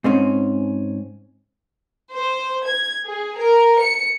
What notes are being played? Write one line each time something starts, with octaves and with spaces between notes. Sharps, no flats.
G#2 C4 C#4
C5
G#6
G#4
A#4
C#7